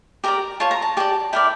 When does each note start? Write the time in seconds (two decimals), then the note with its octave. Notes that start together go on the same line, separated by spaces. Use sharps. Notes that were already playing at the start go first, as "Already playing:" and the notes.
0.24 G4 A#4 D5 A#5
0.60 F4 C#5 A5
0.71 A#5
0.82 A5
0.97 G4 D5 A5
1.33 E4 A#4 D5 G5